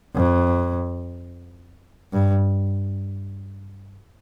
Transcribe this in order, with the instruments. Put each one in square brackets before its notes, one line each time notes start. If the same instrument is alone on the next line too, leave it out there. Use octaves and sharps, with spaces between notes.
[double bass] F2
G2